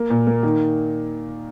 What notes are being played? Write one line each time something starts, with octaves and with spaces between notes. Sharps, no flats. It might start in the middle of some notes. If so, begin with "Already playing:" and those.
Already playing: A#3
A#2
A#3
D#3